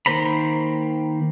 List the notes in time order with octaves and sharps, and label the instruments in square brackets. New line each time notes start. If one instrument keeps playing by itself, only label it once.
[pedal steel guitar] D#3 A#3 C5 A#5 B5